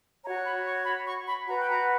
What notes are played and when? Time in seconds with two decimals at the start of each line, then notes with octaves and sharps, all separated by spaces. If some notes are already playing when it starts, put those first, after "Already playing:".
0.24 C#5 A#5
0.28 F#4
0.44 B5
0.65 C#6
0.85 B5
1.05 C#6
1.26 B5
1.46 F#4 B4 A#5
1.57 G5
1.68 A#5